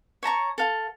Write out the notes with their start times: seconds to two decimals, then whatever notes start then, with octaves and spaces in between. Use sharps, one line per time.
0.23 C#5 A5 A#5 C#6
0.58 A4 F5